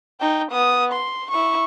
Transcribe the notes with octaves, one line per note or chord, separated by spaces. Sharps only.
D#4 G5
B3 D#6
C6
E4 C#6